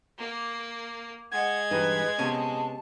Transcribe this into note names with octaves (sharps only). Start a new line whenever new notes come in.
A#3
G#3 F#5 G#6
G2 E3 D#4 B4
C3 B3 C#4 A5